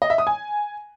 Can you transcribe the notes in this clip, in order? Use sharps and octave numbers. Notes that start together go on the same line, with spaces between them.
D#5
E5
D#6
G#5